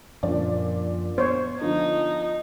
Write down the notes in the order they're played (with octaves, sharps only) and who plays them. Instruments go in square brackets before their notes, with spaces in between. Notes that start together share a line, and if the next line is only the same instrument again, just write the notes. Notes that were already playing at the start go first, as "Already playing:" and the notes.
[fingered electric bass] F#2 F3 C#4 [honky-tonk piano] A#2 D3 D5
[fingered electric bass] B3 [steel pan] C5 C#5
[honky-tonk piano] D3 F3 [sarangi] D#4